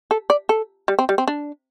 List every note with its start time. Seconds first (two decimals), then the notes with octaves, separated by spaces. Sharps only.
0.11 A4
0.30 D5
0.49 A4
0.88 G3
0.99 C4
1.09 G3
1.18 C4
1.28 D4